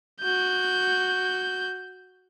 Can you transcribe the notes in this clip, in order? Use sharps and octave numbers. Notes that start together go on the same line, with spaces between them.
F#4 G6